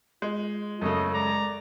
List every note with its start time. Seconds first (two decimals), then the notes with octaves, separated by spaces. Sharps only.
0.22 G#3 F4
0.81 F#2 C#3 A3 A4 D#5
1.14 G#3 D5 A#5